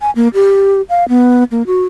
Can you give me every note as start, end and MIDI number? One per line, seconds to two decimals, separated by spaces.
0.01 0.10 80
0.16 0.28 58
0.34 0.82 67
0.89 1.07 77
1.09 1.44 59
1.51 1.63 58
1.67 1.84 66